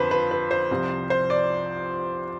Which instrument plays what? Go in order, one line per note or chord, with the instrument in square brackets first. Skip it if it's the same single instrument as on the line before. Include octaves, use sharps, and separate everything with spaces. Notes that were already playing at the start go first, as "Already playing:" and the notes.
Already playing: [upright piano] F2 D3 F3 B4 C5
B4
B4
C5
C2 C3 F3
C5
D5